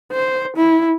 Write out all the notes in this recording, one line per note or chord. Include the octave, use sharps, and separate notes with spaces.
C5
E4